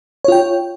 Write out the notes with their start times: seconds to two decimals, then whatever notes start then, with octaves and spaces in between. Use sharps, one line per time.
0.24 C#5
0.28 F4
0.32 G5